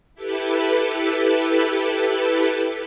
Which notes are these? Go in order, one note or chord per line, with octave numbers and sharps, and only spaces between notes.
E4 G4 A4 B4